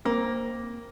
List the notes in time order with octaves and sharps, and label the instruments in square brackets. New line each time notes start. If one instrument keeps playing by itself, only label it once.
[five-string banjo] A#3 [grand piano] C4